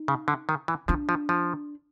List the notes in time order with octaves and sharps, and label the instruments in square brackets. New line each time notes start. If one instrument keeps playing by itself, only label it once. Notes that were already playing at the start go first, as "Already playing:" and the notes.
Already playing: [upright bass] D#4
[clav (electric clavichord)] C#3
D3
D#3
E3
[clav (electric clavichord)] F3 [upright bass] D4
[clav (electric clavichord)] F3
F3